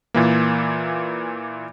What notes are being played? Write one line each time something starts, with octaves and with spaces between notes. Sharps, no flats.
A#2 E3 A#3